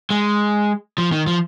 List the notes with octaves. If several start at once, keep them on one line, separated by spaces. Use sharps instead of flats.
G#3
F3
D#3
F3